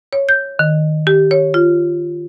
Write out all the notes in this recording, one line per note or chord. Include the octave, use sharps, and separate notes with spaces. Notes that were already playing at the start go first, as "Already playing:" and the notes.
C#5
G6
D#3
G4
C#5
F4